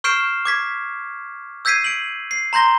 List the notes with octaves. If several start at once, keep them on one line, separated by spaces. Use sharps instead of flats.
C#6 F6 G6 C7 D7 E7
D6 G#6 B6
E6 G6 G#6 B6 C7 D#7
D7 F#7
C7
A#5 C6 G6 A#6 G7